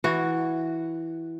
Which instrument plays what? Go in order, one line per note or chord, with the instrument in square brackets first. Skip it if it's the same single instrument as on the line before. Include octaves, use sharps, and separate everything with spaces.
[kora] E3 F#4